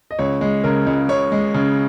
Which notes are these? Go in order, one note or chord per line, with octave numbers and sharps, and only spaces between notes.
D#5
C#2 C#5
G#3
C#3 A#4
C#2
C#2 C#5
G#3
C#3